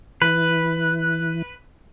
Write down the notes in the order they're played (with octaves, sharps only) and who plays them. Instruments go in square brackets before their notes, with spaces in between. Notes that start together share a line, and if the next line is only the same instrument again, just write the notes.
[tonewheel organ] E3 [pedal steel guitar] B4